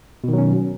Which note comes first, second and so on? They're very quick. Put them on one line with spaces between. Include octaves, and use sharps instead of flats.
B2 D#3 F#3 C#4